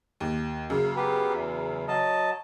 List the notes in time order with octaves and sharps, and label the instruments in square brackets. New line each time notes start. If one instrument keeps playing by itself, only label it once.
[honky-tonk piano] D#2
[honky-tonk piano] F#2 C#3 [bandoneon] A#3
[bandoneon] B3 G4 B4
E2
F#3 D#5 A5